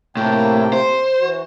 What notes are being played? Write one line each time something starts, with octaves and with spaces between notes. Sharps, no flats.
A2 C3 A#3 G5
C5
E3 F#4